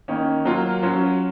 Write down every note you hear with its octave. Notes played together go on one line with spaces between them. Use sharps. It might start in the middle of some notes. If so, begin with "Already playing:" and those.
D#3 A#3 C#4
F#3 A#3 F4
F#3 C#4 F4